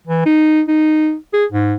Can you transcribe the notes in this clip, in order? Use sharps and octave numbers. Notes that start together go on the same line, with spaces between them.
E3
D#4
D#4
G#4
G#2